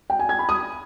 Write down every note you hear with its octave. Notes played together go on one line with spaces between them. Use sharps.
G5
G#5
G#6
B5
D#6